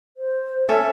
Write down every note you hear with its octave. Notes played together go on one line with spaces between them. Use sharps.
C5
C#4 A4 E5